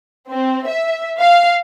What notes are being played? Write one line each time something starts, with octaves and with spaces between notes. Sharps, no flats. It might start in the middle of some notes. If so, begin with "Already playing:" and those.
C4
E5
F5